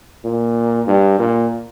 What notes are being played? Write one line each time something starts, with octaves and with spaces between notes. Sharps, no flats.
A#2
G2
A#2